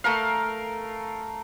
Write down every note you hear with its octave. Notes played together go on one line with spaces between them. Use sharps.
A3 A#4 F5